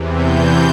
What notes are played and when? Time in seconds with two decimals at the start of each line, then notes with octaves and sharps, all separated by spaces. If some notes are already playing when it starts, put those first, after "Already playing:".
Already playing: E2 C3 E3
0.14 G6